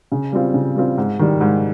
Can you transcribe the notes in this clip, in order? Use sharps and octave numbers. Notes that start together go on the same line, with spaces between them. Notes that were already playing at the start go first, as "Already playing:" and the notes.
C#3
G3 C4 F4
C#3
G3 C4 F4
G#2
D#3 G3
G#2